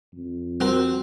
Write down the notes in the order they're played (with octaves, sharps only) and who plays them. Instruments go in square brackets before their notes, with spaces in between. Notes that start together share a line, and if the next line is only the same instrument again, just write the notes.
[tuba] F2
[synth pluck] G3 F#4 A#4 [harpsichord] C4